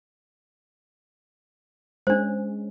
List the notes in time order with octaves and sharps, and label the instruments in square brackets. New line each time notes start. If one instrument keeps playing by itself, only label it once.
[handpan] G#3 C#4 [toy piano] D4 C5